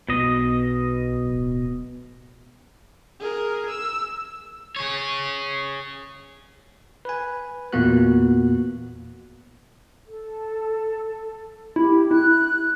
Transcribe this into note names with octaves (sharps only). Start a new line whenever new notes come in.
B1 B2 D#5
D1
G#4 A#4
E6
G#4 C#5
B4 G#5
E2 A#2 A#3 B3 F#4 F#6
A4
E4 G4
E4 F#6